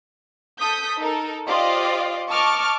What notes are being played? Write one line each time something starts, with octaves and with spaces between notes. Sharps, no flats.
A4 D#6 G6 B6
D#4 A4 A#4
F4 G4 C5 D5 D#5 F5
D#5 A5 C#6 D6 F6